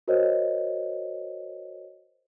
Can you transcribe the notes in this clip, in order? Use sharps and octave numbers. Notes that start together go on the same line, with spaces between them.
F#4 A#4 C5 C#5 D#5